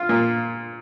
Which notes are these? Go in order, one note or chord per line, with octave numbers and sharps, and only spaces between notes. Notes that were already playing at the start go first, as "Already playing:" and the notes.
Already playing: F4
A#2